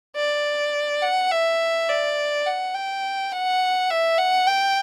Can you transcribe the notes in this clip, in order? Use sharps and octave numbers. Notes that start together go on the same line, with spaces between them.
D5
F#5
E5
D5
F#5
G5
F#5
E5
F#5
G5